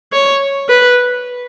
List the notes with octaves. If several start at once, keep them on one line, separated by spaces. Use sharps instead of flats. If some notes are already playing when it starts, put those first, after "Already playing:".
C#5
B4